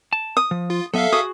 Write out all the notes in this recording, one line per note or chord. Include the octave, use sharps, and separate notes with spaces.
A5
D#6
F3
F4
F#3 B3 A4 E5 F5
F#4 G#4 D#6